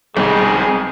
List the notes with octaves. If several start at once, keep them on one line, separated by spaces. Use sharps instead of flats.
B1 G3 G#3 C4 D#4 G#4